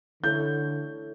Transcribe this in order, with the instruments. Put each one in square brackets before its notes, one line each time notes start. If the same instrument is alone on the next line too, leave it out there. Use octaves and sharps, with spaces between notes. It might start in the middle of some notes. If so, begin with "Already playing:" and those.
[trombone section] D3 [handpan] E4 A4 C#5 [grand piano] G6